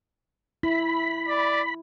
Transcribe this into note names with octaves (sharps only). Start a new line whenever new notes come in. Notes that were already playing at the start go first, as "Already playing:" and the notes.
E4 B5
D5